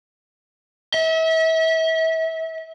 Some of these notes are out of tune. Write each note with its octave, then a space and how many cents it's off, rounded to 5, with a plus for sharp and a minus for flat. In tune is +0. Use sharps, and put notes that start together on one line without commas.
E5 -35